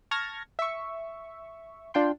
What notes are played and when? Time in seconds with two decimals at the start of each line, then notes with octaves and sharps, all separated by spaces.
0.11 A5 C#6 F6 G#6 A#6
0.59 E5 C#6
1.94 D4 F4 G5 C6